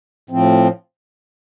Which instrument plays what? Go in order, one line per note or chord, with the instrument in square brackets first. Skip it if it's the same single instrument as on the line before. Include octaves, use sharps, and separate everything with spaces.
[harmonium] A2 F3 C4